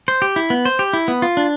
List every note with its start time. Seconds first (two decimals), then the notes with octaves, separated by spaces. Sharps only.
0.08 C5
0.22 G4
0.36 E4
0.50 B3
0.65 C5
0.79 G4
0.93 E4
1.08 B3
1.22 F4
1.37 D4